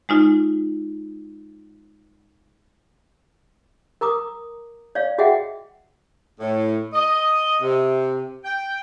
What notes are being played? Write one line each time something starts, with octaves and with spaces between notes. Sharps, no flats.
G#3 D#4 F4
A#4 A#5 D6 D#6
C#5 D5 F5
F#4 G#4 D#5 E5 F#5 G5
A2
D#5
C3
G5